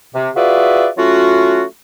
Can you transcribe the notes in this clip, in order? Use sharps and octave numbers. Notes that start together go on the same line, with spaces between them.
C3
F4 F#4 G#4 B4 D5 E5
F#3 A3 C#4 F4 F#4